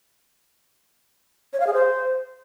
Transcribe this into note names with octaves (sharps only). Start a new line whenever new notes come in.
C#5
F5
G#4
C5